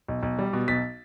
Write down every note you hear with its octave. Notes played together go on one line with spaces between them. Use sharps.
B1
B1
G3
B2
B1 A6 B6